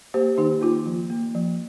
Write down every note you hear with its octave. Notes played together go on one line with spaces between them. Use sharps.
A#3 G4 C5
D#3 D#4 G4
A#3 F4
F3
A#3
F3